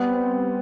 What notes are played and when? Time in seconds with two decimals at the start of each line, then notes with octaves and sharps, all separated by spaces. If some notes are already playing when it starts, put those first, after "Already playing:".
Already playing: G3 B3
0.09 C4
0.32 G3